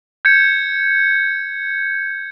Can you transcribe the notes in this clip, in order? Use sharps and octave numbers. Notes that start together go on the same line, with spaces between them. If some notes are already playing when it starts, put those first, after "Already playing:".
G6 G#6 C#7